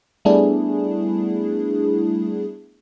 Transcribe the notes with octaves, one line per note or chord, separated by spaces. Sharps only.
G3 A3 B3 D4 E4 G#4